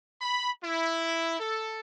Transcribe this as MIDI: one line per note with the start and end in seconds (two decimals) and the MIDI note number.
0.21 0.50 83
0.64 1.38 64
1.40 1.80 69